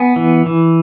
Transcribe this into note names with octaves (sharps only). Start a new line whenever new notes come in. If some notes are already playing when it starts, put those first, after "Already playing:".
Already playing: B3 G#5
E3
E3